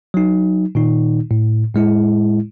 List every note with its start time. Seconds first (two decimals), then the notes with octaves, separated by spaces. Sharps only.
0.14 F#3 D#4
0.75 A#2 D#3 D#4
1.31 A2
1.74 A2 G#3 E4